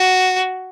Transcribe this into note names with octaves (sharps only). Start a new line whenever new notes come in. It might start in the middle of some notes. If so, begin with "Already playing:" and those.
Already playing: F#4